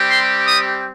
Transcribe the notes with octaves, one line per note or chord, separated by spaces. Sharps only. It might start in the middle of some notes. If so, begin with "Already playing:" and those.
Already playing: G3 C4 G4
C6
D#6